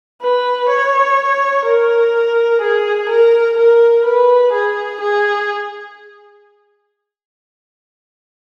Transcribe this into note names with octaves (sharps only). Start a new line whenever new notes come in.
B4
C#5
A#4
G#4
A#4
A#4
B4
G#4
G#4